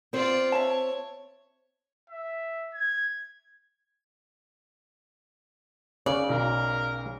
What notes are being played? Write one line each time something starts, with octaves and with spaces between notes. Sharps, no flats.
C4 F4 C5 D5
C#5 E5 A5
E5
G#6
C#3 D5
B1 A#4